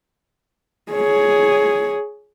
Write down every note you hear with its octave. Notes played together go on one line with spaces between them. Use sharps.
G#4 C#5